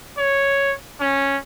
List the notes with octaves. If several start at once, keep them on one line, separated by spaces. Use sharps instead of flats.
C#5
C#4